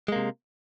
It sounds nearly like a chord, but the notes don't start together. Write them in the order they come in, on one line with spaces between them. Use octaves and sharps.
G#3 A#3 C3